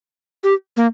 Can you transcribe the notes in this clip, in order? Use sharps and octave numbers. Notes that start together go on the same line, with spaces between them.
G4
A#3